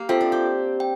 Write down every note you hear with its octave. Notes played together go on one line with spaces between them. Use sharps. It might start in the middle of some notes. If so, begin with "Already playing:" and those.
Already playing: A#3 G4
C4 F4 A4 E5 G5
D4
G4
G5